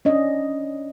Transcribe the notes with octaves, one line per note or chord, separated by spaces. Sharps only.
C#4 D4 D#5